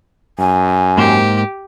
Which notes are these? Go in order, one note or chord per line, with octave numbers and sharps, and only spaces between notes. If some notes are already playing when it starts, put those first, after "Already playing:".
F#2 G#5
G#2 A#3 G4 C5